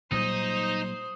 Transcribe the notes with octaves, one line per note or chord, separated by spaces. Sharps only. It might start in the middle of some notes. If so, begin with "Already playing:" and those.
A#2 F#3 G3 D#4 C5 D#6